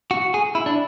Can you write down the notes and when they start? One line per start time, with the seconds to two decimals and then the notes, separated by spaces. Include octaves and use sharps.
0.11 F#4
0.34 G#4
0.55 E4
0.66 D4